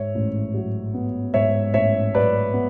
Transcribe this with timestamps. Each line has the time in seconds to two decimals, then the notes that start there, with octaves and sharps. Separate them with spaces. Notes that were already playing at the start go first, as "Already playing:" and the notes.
Already playing: G#2 C#5 E5
0.15 A1
0.54 F#3
0.94 B3
1.34 G#2 C#5 E5
1.74 A1 C#5 E5
2.15 F#3 B4 D5
2.53 B3